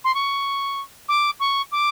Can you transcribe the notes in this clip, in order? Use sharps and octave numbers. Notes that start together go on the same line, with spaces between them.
C6
C#6
D6
C#6
D6